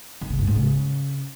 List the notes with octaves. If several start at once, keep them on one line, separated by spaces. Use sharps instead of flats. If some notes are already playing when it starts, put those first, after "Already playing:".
D#3
C#3
G2
G#2
C#3